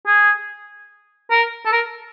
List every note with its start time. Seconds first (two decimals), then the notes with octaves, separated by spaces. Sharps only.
0.07 G#4
1.31 A#4
1.65 A4
1.72 A#4